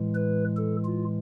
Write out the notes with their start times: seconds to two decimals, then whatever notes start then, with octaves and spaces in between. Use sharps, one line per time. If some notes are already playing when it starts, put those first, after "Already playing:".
Already playing: A2 E3 G#3
0.15 B4
0.57 A4
0.85 F4